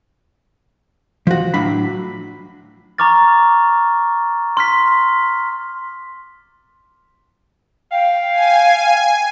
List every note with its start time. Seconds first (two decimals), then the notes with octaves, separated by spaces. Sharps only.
1.27 F3 F#4
1.54 A2 F#3 D4 B5
2.98 A#5 C#6 D6 F6 A6
4.57 C6 F6 B6
7.92 F5 G5
8.32 G#5